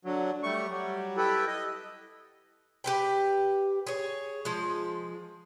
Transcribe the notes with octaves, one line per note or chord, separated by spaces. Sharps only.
D3 F#3
G3 A3 C#6
F#3 G3
E4 G4 A4 B4
D#5
G4 B4 G5
G#4 C#5
F3 G#3